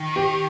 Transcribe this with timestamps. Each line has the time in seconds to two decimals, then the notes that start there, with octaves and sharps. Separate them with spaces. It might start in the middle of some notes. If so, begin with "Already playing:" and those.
Already playing: D#3
0.16 G4